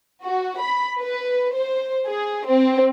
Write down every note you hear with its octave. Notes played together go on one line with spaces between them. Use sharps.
F#4
B5
B4
C5
G#4
C4